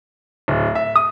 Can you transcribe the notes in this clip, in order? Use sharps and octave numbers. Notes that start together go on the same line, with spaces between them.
D1
E5
D#6